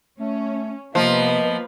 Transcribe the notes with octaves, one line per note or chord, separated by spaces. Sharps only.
A3 C#4
C3 F3 A#3 B3 B4 D#5